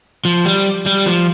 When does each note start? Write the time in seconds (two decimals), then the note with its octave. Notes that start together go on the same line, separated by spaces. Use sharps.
0.25 F3
0.45 G3
0.86 G3
1.06 F3